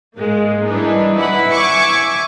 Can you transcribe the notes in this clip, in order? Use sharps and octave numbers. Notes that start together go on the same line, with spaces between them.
G#2 G#3 A#3
E3 G3 D4 D#4
E4 B4 F#5 B5
E5 G#5 C#6 D6